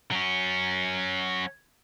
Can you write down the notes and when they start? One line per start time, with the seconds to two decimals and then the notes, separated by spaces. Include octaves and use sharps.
0.12 F#3 C#4